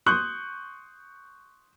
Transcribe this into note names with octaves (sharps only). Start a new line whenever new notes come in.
C6 C#6 D#6 F#6 G6 F#7